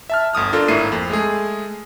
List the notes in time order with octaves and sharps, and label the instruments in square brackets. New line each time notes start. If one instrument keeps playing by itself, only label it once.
[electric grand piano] E5 A5 F6
G1 D2 D#6 F6
D4 F4 A4 A#4
G#1 A2 A#3 E4 C7 D#7
F2
G#3 A3 G#4